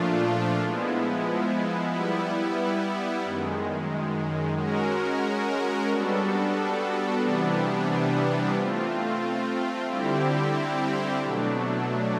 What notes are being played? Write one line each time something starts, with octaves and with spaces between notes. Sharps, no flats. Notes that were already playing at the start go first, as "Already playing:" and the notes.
Already playing: A#2 F3 A3 D4 F4
F3 G#3 B3 E4
G3 B3 E4
F#2 D#3 G#3
G#3 C#4 F#4 A#4
G3 B3 D4 F#4 A4
C3 E3 G3 B3 D4
A3 C4 F4
D3 G3 C4 E4 G4
B2 F#3 A3 D4